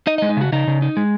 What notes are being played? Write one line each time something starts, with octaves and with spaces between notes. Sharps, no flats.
D#4 D#5
G#3 D#5
D#4
C#3 F#4
C#3 D#4
C#3
D#4
G#3